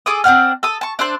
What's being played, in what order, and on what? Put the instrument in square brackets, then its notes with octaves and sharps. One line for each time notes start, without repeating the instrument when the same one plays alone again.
[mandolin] G#4 A4 D6 D#6
C4 D4 F#5 F6
A4 D#6
A5 C#6
D4 A4 C5 F#6